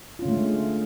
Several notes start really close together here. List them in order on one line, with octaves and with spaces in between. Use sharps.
F4 C#4 D3 A3 G#3